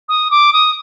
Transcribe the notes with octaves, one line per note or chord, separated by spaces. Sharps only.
D#6
D6
D#6